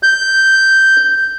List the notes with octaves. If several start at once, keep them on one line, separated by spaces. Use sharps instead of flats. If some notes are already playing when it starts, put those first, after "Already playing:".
G6